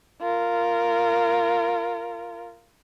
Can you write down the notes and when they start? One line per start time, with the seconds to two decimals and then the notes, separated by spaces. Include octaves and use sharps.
0.21 F4 A#4